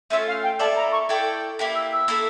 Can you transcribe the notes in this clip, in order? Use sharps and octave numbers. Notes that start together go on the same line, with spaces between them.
A3 C#4 F4 E5
F5
G5
A#3 E4 A4 D5 A5
A#5
C#6
E4 A4 D5 G5
A#3 E4 G4
E6
E6
A#3 E4 A4